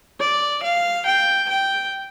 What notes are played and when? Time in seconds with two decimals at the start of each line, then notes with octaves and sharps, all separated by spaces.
0.20 D5
0.63 F5
1.06 G5
1.49 G5